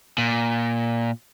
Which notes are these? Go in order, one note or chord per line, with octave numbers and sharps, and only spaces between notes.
A#2